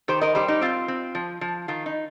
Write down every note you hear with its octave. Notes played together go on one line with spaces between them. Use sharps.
D#3 G4 C5
A#4 D#5
G3 G4 C5
D#4 G4
C4 F4
C4
F3
F3
D#3 F4
D#4